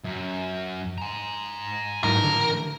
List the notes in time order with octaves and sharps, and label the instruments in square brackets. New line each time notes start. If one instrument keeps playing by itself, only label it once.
[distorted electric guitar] F#2
G#5 A#5
[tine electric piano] G#2 F#3 D#4 [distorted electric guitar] E3 A3 [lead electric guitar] A#4
[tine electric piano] D3